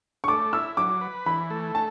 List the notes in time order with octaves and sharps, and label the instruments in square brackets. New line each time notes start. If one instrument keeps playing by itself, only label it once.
[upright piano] C#6
[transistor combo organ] A3 [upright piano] D6
[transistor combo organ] E4 [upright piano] E6
[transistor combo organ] F#3 [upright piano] D6
[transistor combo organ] B4
[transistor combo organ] E3 [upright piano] B5
[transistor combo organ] A3
[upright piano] A5